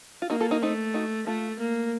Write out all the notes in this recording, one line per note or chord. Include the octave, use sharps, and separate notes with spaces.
F4
A#3 D#4 F#4
F4 A4
D#4 F#4
A3 C4 D#4
D#4 F#4
A3 F4 A4
A#3